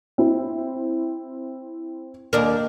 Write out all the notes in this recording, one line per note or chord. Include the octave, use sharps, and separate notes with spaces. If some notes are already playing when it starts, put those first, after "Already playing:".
C4 E4
D#2 D4 A#4